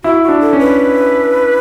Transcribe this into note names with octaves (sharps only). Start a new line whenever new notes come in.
E4 F#4
F#4
D4
A4
C#4
B4